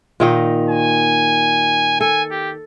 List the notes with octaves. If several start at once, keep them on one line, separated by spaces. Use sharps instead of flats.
A#2 D#3 D#4
G#5
A4 G#5
G4